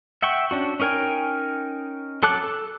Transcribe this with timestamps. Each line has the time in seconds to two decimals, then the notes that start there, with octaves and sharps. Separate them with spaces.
0.22 E5 F#5 G5 C#6
0.51 C#4 D4 F#4
0.80 C#4 D#4 A#4 G5 G#5
2.23 F#3 A4 A5 D6 F#6
2.44 A4